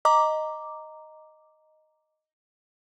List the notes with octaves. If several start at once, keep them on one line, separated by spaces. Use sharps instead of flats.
D#5 A#5 D6